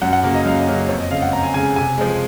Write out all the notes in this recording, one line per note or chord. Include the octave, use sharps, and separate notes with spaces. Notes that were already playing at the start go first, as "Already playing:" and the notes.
F#2 F#5
F#5
C#3 F#3 A#3
D#5
F#2 F5
D#5
C#3 F#3 A#3
F2 C#5
D#5
C#3 F5
G#3
F#5
F2 A#5
G#5
C#3 G#3 G#5
C3 G#5
F3 G#3